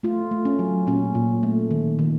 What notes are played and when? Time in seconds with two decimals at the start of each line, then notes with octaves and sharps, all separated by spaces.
0.03 A3 F4
0.31 A3
0.45 C#4
0.59 F#3
0.87 A#2 C#4
1.15 A#2
1.43 A3
1.71 D#3
1.99 D#3